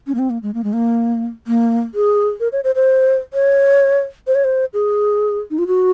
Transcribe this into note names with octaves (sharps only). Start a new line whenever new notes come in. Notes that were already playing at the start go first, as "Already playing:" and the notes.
C#4
A#3
C4
A#3
G#3
A#3
G#3
A#3
A#3
G#4
A#4
C#5
C5
C5
C#5
C5
C#5
C5
G#4
D#4
F4
F#4